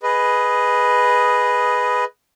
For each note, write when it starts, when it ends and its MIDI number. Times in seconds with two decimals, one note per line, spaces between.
0.03 2.04 68
0.03 2.04 71
0.03 2.04 75